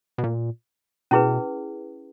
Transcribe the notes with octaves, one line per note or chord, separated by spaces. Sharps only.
B2
A#2
B2 C#4 E4 G#4 B4